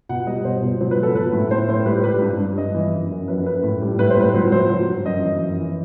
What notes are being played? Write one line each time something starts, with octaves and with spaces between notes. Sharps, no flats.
B2 F#5
G3 D#5
B2 C5
B2
F#3 C5
B4
F#3
A4
F#3 B4
A2
A2 C5
A2 C5
G3 B4
G3 B4
G2
G2
G2 D#5
E3
F#2
F#2
F#2 B4
F#2 B4
A2
G3
A2 B4
C5
A2 B4
F#3 C5
F#3 C5
F#3
G2
F#2 D#5
E3
F#2
E3